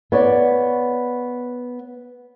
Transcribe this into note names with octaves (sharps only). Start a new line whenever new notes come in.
B3 C#5 D5